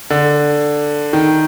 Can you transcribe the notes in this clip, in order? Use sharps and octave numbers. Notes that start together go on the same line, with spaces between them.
D3
D#3